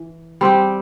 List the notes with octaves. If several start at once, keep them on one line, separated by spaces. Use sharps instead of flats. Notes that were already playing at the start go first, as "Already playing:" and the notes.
Already playing: E3
G3 C4 G4